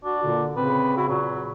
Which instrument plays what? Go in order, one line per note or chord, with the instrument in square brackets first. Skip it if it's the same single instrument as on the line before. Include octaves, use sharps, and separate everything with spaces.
[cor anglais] D4 [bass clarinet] F#4
[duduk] A#2 [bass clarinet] D3
[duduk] C#3 [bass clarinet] C4 [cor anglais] B4
[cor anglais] E4 [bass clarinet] F#4
[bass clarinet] A#2 [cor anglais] F#3